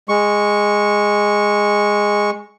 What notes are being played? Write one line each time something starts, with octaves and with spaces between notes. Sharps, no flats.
G#3 C#6